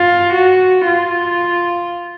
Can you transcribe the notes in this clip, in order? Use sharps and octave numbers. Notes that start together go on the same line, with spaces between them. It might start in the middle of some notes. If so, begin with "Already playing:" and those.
Already playing: F4
F#4
F4